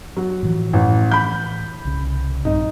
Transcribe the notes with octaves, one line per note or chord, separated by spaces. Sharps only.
F#3
A2 E3 F3
A1
B5 G6
C2 C#3
A#1 G2 C4 D#4